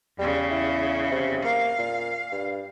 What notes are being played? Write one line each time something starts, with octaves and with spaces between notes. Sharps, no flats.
E2 C#3 G3
E4
C3
A#3 F5
A#2
G2